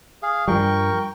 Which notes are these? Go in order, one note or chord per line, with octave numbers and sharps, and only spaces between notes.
G#4 F5
G2 F3 G3 A#4 G5 C#6